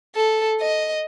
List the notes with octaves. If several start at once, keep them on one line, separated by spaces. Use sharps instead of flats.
A4
D#5